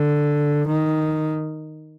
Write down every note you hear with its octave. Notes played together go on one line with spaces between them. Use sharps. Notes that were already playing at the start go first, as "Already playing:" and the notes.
Already playing: D3
D#3